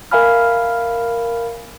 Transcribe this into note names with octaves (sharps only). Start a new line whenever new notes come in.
A#4 E5 F5 G#5 B5 F6